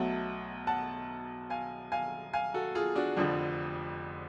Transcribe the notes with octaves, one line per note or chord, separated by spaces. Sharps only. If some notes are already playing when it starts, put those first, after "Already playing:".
Already playing: B1 B2 F#3 A3 F#5 A5
F#5 A5
F5 G#5
F5 G#5
F5 G#5
F#4 A4
F4 G#4
D4 F#4
F1 F2 D3 F3 D4